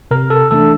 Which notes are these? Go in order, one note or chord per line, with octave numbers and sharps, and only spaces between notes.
C3 A#4
A4
E3 A3 D4 A4